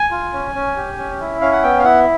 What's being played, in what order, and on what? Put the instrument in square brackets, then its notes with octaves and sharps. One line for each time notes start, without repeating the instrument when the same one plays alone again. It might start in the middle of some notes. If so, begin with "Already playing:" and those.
Already playing: [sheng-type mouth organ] G#5
F4
C#4
C#4
G4
C#4
E4
C#4 F5
F#5
B3 G5
F5
E4 F#5